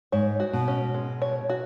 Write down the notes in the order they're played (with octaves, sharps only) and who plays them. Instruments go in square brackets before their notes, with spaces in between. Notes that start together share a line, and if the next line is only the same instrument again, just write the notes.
[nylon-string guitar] G#2 [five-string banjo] C#5
[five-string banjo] F#4
[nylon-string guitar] B2
[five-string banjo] C#4
G#3
C#5
F#4